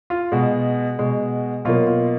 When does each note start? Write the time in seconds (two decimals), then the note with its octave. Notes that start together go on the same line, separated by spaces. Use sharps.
0.10 F4
0.32 B2 G#3 F#4
0.99 B2 G#3
1.65 B2 F#3 A#3 F4
1.87 F4